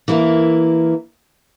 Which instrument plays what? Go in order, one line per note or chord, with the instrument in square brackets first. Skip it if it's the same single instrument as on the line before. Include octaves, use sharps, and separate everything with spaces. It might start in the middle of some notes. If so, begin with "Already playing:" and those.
[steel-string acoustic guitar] E3 A#3 E4 A#4